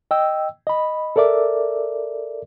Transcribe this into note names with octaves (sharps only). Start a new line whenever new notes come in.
D#5 G5 E6
D#5 B5
A4 A#4 D5 E5 D6